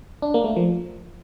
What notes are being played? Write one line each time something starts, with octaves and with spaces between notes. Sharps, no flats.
D4
A#3
A3
F3